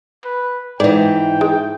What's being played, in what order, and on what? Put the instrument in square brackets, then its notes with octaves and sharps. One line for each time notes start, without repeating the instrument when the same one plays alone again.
[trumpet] B4
[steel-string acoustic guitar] G#2 E3 [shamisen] D5 [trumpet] G5
[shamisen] G#3